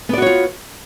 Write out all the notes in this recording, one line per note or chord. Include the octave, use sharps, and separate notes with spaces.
B3 F4 F#4 C#5 D5